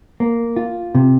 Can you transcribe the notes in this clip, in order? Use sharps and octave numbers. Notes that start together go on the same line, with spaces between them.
A#3
F4
C3